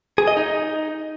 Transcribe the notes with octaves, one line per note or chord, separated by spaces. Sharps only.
G#4
D#5
D#4